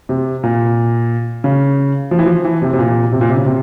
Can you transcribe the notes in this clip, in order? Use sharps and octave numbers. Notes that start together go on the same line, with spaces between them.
C3
A#2
C#3
F3
E3
F3
E3
C3
C3
A#2
C3
A#2
C3
C#3
C3